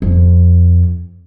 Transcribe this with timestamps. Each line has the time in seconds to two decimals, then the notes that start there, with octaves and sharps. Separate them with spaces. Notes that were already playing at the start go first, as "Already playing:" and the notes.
0.02 F2